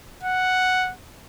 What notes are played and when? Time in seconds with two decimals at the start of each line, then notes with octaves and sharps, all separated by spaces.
0.24 F#5